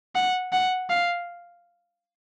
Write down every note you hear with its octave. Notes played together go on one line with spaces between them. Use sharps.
F#5
F#5
F5